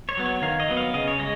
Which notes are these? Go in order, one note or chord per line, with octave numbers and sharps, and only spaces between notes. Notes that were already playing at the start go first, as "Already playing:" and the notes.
C#5
F#3 B3
C#5
D#3 F5
D#5
F#3 B3
F5
C#3 D#5
C#5
G#3 D#5